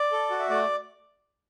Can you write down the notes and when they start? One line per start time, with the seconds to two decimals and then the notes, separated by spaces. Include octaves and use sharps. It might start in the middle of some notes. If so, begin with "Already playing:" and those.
Already playing: D5
0.12 A4
0.31 F#4
0.39 E5
0.49 A3 D5